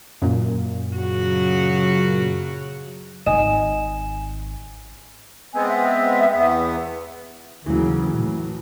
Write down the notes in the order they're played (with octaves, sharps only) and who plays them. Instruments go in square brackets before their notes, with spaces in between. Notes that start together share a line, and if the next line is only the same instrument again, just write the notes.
[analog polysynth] F#2 A#2
[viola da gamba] C#3 F#3 F#4
[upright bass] G#1 [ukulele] D#5 [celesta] G#5 E7
[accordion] G#3 B3 C4 [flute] G#5
[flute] E5
[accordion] E2 B3
[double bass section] D#2 C#3 [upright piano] E3 F#3
[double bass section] A2